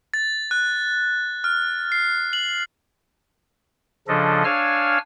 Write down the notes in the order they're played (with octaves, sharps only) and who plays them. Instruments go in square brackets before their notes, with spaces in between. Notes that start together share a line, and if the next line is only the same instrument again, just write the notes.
[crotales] A6
F#6
F6
C7
F#7
[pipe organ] C#3 F3 D4 A4 D#5
D4 C#5 F5 G#5 E6 F6